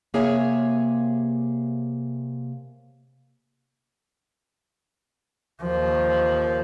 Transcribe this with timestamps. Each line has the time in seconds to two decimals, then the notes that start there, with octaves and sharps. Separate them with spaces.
0.14 C3 A#3 G#4 C#5 E5 G#5
5.62 D#2 F3